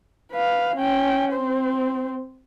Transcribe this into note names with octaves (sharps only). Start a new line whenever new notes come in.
B4 F5
C#4 G5
C4 C5